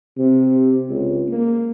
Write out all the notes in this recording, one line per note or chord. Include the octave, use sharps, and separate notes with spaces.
C3
C#2
A#3